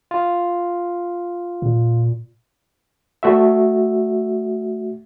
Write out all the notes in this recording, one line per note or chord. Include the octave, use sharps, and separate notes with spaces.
F4
A#2
A3 F#4 E5